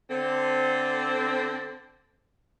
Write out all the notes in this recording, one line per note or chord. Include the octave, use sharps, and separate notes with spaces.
D3 C4